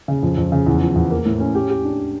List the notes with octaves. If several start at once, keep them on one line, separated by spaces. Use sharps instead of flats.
C#3
F2
F2
C#3
E2
F3
E2
A#3
A2
C#4
G4
G4
D4